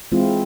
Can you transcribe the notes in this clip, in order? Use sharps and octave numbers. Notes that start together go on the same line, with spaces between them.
E3 G#3 C4 E4 F4